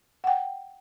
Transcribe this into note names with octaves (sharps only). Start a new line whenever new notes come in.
F#5 G5